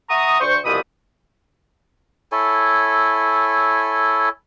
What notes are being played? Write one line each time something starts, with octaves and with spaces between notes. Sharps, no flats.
E5 F#5 A#5 C#6 D#6
D2 C5 C#6
C2 B2 E3 F3 B5 D#6
E4 A4 C#5 G#5